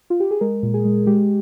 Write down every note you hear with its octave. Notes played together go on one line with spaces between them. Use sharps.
F4
G4
G#4
G#3 A#4
A#2
G#4
G#3
G#3 G4